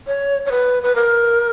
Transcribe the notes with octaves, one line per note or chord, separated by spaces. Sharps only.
C#5
C#5
B4
B4
A#4